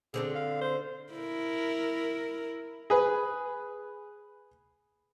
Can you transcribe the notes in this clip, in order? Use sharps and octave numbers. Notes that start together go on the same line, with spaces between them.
D3 C4 D4 G#4
F5
C5
E4 A#4
G#4 B4